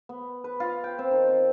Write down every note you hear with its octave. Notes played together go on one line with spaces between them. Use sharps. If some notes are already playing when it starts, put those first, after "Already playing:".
B3
B4
F4
G5
C4
D#3
C4